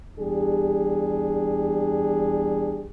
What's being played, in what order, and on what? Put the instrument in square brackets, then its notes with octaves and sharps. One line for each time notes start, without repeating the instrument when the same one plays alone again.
[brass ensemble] E2 G3 D4 G4 G#4